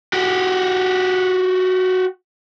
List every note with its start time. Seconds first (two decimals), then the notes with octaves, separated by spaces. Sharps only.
0.13 F#4 G4